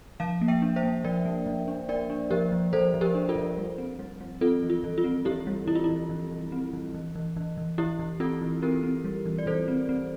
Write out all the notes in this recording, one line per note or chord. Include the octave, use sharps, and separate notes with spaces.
F3 F5 A5
A#3
E5 G5
D4
C5 E5
A#3
F3 A#4 D5
A#3
F3
D4
D4 A#4 D5
D4
F3 G4 A#4
F3
F3 A4 C5
F3
G4 A#4
D4
F4 A4
F3
G3
C4
G3
G3
C4 F4 A4
E3
F4
E3
F4
C4
E3 E4 G4
G3
E3 E4
F4
E3 E4
E3
E3
C4
E3
E3
E3
E3
E3
E3 E4 G4
E3
C4 F4 A4
E3
C4 G4 A#4
C4
G3
E3
D5
E3 A4 C5
C4
C4